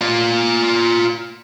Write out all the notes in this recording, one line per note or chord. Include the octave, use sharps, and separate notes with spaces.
F4 D5